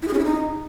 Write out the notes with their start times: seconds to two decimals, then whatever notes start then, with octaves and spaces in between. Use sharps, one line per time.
0.02 E4
0.08 G#4
0.13 C#4
0.19 E4
0.25 D#4